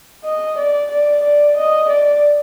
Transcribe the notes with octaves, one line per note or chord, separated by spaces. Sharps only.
D#5
D5
D5
D5
D#5
D5